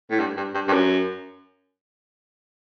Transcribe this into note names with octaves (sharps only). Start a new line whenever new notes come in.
A2
G2
G2
G2
G2
F#2